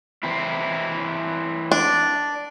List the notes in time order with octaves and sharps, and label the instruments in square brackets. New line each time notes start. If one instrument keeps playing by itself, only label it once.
[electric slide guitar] E3 C4 E4
[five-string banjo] D4